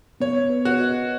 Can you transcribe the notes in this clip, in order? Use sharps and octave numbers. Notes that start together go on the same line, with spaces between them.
B3 C#5
B4
F#4
D#5